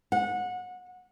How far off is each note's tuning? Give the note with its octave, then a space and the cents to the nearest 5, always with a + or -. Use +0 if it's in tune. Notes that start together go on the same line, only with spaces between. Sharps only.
F#5 -25